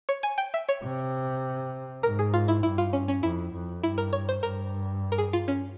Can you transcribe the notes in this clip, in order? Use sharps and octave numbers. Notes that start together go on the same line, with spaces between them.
C#5
G#5
G5
E5
C#5
C3
G#2 A#4
G#4
F4
E4
G2 E4
F4
C#4
C#4
F2 E4
F2
G2 E4
A#4
C#5
C5
G2 A#4
A#4
G#4
F4
C#4